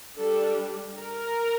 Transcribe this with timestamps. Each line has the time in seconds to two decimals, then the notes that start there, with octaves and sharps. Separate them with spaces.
0.17 G3 D4 A4
0.98 A#4